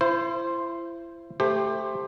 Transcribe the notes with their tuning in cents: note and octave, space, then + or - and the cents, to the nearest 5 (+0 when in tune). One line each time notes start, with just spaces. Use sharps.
E4 +35 C5 +0
A3 +0 G4 +20 C5 +0